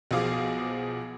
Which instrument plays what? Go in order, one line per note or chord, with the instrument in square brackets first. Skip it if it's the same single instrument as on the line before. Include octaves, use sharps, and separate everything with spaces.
[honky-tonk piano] B1 B2 F3 G#4 F5 D6